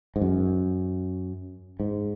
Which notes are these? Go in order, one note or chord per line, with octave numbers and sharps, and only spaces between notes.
G#2
F#2
G#2